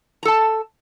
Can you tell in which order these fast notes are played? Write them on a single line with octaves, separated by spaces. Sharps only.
A#5 A4 A5